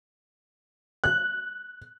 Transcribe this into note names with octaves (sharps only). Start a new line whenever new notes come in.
F#6